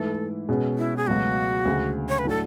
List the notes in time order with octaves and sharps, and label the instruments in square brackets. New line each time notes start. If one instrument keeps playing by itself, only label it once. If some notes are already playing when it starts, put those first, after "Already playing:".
Already playing: [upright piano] G#2 E3 A3 E4 [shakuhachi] A4
[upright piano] B2 G#3 C#4 G#4
[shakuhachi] E4
G#4
[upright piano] C#2 B2 F#3 A3 [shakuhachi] F#4
[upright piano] D2 C#3 G#3
[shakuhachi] C#5
B4
[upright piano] A2 F#3 A3 D4 [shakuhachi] A4